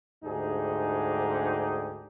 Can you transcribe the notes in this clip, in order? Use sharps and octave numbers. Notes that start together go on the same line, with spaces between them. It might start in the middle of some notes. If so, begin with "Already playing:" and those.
D2 G#2 D4 D#4 G4 G#4